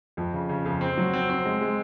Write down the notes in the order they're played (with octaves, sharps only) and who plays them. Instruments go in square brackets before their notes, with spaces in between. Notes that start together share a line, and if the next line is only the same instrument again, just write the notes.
[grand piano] F2
C#3
C#3
F2
C4
F#3
C4
C4
G#3
G#3